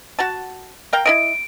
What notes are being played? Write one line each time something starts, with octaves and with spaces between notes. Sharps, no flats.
F#4 F#5 A5
A#4 F5 G5
E4 A#4 D#5 D7